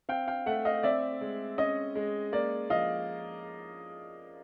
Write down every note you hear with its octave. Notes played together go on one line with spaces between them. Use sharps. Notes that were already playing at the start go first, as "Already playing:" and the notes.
C4 F5 G5
F5 G5
A3 E5 F#5
D#5 F5
C4 D5 E5
G#3
C#4 D#5
G#3
A#3 D5
F3 D#5 F5